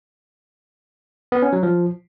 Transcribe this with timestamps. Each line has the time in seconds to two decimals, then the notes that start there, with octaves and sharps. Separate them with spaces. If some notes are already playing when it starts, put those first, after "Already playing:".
1.32 B3
1.42 C#4
1.53 F#3
1.63 F3